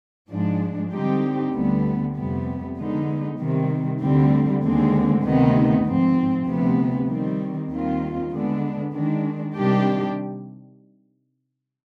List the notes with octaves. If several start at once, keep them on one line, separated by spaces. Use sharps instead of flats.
G#2 F3 G#3 D4
D3 G3 C4 D#4 G4
D2 D3 G3 B3
F2 C3 G3 B3
D3 G#3 B3 D#4
C3 D#3 G3
D2 D3 G3 C4
D#2 D3 G#3 C4
D2 C3 D#3 B3 D#4
G#2 F3 C4
D2 C3 F3 B3
D#3 G3 C4
D#2 D#3 G3 C4 F4
D3 G#3 B3 D4
D#3 G#3 D4
C3 D#3 G3 D4 G4